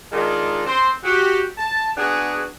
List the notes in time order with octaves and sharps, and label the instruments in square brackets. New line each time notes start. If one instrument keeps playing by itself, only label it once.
[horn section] D#3 G#3 D4 D#4 F4
C4 C5
F#4 G4
A5
B3 D4 F#4 G#4